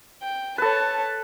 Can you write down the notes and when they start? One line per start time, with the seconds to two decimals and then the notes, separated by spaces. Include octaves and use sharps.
0.22 G5
0.58 A4 B4 C#5 A5